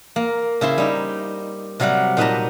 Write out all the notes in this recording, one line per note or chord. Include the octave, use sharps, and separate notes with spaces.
A#3
C#3 E4 C5 C6
G3 D#4
C3 F#3 G3 F5 F#5
A#2 D#4 B4 A5 A#5